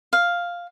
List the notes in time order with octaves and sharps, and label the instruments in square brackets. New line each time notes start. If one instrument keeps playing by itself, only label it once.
[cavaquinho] F5